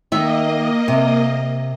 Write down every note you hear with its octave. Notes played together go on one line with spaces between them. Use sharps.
D#3 A#3 D#5 E5
C3